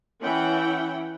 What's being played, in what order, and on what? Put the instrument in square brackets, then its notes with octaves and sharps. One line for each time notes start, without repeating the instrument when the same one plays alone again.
[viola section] E3 C#4 E4 F#5 G5